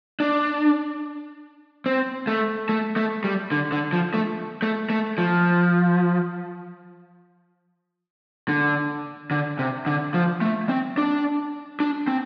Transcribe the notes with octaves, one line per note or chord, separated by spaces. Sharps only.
D4
C4
A3
A3
A3
G3
D3
D3
F3
A3
A3
A3
F3
D3
D3
C3
D3
F3
A3
C4
D4
D4
C4